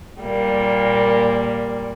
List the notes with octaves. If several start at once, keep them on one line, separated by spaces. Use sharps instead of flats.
A#2 G3 A#3